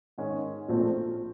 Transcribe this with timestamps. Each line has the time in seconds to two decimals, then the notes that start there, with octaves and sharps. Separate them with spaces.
0.18 G#2 D#3 G#3 C#4
0.68 A#1 A#2 F3 A3 C4